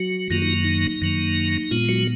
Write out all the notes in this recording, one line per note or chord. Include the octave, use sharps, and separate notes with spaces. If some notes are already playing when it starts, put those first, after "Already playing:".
Already playing: F#3 F#4
F#2 D#3 F#3 A#3 F4
D#4
D#4
F#2 D#3 F#3 A#3
A#2 G#3 B3 F4
F#3 F#4